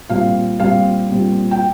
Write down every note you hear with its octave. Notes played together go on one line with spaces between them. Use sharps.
A#2 G3 C4 F5
A#2 G3 C4 F5
A#2 G3 C4
G5